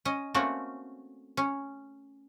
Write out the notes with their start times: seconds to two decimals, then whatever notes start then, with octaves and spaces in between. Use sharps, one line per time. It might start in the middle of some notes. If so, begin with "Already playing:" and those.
0.05 C#4 D#5
0.34 A3 A#3 C4 C#4 F#4
1.37 C#4